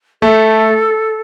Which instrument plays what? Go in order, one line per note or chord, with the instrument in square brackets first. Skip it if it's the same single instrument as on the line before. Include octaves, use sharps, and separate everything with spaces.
[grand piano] A3 [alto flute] A4